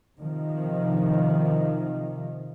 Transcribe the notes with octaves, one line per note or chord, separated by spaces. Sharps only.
C3 D#3 F3